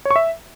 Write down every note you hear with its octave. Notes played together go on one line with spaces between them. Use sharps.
C#5
C#6
E5